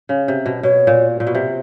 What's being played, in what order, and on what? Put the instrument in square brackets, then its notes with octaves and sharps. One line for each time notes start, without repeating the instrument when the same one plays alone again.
[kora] C#3
C3
B2
[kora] B2 [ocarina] C#5
[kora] A#2
A#2
B2
C3